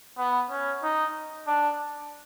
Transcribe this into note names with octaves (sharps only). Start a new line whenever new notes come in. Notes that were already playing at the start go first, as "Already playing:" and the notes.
B3
C#4
D#4
D4